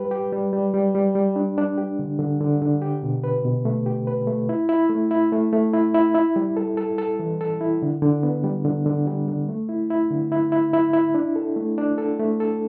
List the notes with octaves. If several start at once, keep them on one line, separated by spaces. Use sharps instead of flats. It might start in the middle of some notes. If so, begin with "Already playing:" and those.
Already playing: G3 G4 B4
G4
G3
G3
G3
G3
G3
D4
D4
G4
D3
D3
D3
D3
G4
B2
B4
B2
A3
G4
B4
A3
E4
E4
A3
E4
A3
A3
E4
E4
E4
G3
A4
A4
A4
E3
A4
E4
D3
D3
B3
G3
D3
D3
G3
D3
A3
E4
E4
D3
E4
E4
E4
E4
D4
A4
A3
D4
A4
A3
A4